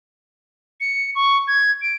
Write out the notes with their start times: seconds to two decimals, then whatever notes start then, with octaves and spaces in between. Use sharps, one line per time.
0.81 C#7
1.15 C#6
1.48 G#6
1.82 D7